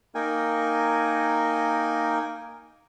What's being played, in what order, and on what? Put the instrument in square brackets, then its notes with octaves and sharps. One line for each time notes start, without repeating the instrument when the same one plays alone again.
[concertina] A#3 D#4 A#4 G5 G#5